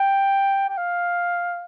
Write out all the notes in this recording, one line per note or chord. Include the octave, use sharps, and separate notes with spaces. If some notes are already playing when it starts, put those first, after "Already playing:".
Already playing: G5
G5
F5